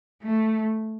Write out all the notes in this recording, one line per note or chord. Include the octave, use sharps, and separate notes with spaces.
A3